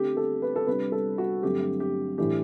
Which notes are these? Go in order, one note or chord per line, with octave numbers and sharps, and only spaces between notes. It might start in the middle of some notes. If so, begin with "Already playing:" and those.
Already playing: D3 A3 C4 G4
A4
B4
A4
C3 G3 D4 B4
A4
F#4
G2 D3 F#3 A3 C4 G4
G4
A2 E3 A3 D4 G4